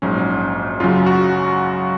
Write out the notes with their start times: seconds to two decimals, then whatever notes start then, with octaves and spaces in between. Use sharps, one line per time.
0.02 A#1 G#2 F#3 C#4
0.80 F#2 C#3 F#3 F4
1.06 F#4